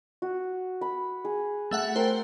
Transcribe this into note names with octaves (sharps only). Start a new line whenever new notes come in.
F#4
B5
G#4
A3 E5 F#5
A#4 C5 G5